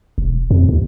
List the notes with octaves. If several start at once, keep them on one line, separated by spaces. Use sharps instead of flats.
E1
F2
D#2